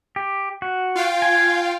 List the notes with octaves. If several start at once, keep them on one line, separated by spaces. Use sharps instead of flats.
G4
F#4
F4 F5 G5
G#5